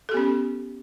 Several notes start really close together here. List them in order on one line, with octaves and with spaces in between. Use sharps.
A4 G4 B3 C#4